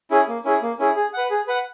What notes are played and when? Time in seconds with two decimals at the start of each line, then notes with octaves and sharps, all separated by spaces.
0.11 C#4 E4 G#4
0.28 A#3
0.45 C#4 E4 G#4
0.62 A#3
0.79 C#4 E4 G#4
0.96 G#4
1.13 B4 F#5
1.30 G#4
1.48 B4 F#5